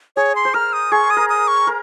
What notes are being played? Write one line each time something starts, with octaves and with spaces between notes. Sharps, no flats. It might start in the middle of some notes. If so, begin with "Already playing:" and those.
G#4 C#5
C6
C5
A#4 F6
D#6
G#4 C#6
D#6
A#4
D#6
C#6
A#4